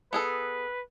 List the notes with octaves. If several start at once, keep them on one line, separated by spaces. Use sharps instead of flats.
B3 G#4 A4 B4